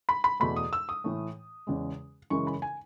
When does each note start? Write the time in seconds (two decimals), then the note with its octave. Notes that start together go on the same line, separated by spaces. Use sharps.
0.09 B5
0.24 B5
0.40 E2 B2 A3 B5
0.56 D#6
0.73 E6
0.89 D#6
1.04 A2 E3 A3
1.67 E2 C#3 G#3
2.30 F#2 C#3 E3 G#3 C#6
2.47 B5
2.62 G#5